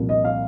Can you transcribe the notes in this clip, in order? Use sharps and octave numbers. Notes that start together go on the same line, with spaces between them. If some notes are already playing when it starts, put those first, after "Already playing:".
Already playing: C2 A#2 F3 A#3
D#5
F5